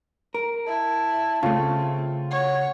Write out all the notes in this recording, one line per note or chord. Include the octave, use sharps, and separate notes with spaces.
A#4
E4 A5
C#3 A3 C4 F4
C#5 F#5